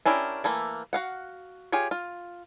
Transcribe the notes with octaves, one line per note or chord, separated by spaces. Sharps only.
C#4 D4 E4 G4 A#4
E3 A3 A#3
F#4 F5 F#5
F4 G4 G#4 C#5
F4